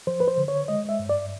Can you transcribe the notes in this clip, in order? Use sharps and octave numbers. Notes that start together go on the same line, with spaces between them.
F3 C5
B4
C5
D3
C#5
G#3 D#5
E5
G2
D5